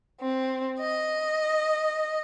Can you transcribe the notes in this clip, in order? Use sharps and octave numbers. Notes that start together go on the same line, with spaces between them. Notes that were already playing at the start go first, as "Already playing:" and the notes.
C4
D#5